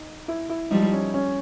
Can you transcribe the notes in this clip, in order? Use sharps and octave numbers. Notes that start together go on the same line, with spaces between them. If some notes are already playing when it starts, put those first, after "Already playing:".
Already playing: D#4
E4
E4
F3 G3 D#4
C#4
C#4